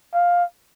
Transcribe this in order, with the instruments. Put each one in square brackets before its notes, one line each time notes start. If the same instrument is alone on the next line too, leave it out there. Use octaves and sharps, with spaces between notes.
[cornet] F5